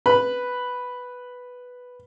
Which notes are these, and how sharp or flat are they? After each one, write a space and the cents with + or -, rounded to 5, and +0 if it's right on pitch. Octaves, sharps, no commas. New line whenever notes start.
B4 +0 B5 +0